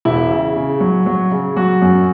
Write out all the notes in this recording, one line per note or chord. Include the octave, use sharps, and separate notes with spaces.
E1 E4
C#3
C#3
F#3
F#3
C#3
F#3 F#4
F#2